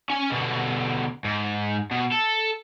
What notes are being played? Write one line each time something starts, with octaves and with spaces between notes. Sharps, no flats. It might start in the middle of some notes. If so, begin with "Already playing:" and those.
C#4 G#5
B2 D3
G#2
B2
A4